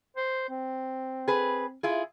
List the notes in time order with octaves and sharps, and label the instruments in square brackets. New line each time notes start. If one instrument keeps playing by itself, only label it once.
[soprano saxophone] C5
C4
[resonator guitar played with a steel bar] G#4 B4
E4 F4 G#4